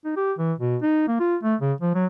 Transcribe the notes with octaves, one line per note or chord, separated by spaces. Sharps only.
D#4
G4
E3
B2
D#4
A#3
F4
A3
C#3
F3
F#3